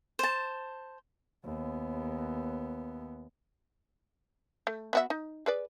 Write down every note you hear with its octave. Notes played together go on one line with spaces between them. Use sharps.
C5 A5
D#2 B3
A3
B3 F#4 E5
D#4
G#4 B4 D5